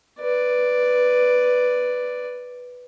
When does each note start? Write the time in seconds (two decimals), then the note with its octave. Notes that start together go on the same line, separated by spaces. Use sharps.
0.20 B4 D5